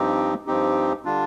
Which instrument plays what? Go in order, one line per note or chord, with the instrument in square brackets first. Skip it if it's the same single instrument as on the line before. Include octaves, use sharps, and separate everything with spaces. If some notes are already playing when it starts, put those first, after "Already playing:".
Already playing: [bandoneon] G2 F3 C4 D#4 G4
G2 F3 C4 D#4 G4
D3 G3 D4 F4